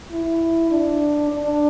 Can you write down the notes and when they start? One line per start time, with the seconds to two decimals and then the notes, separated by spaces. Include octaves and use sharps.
0.11 E4
0.71 D4
1.30 D4